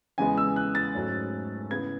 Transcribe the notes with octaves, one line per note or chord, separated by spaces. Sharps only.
E2 C#3 G#3 B3 G#5
E6
F#6
A6
G#2 F#3 A3 C#4
C#3 E3 B3 G#6